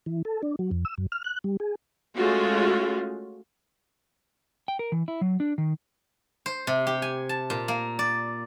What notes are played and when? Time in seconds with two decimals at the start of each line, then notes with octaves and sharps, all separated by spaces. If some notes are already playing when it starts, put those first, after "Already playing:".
0.06 E3
0.25 A4
0.43 D4
0.59 F#3
0.71 F2
0.85 E6
0.98 F#2
1.12 F6
1.24 F#6
1.44 G3
1.60 G#4
2.16 G#3 A3 C#4 F4 F#4
4.68 G5
4.79 A#4
4.92 E3
5.08 E4
5.21 F#3
5.40 D4
5.58 D#3
6.46 C5
6.67 C3
6.87 G4
7.02 G#5
7.29 A5
7.50 A#2
7.68 A#3
7.99 D5